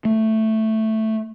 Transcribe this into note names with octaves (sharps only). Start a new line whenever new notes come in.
A3